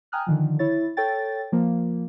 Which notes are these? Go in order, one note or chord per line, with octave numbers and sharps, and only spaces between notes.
G5 G#5 A#5 D#6 F6 F#6
D3 D#3 F3
E4 C#5 A6
A4 C#5 G5 A6
F3 A#3